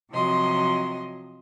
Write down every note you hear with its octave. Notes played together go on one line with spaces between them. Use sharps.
C3 F3 F#3 D#5 C6